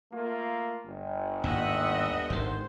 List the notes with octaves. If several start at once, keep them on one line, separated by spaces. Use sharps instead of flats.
A3 A#3 F4
G1
D#2 G#2 D#5 E5 F#5
G#1 D#3 C5